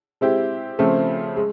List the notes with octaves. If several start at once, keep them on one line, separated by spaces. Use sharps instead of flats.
G#3 C4 E4 G4
C#3 F3 A3 C4
G#3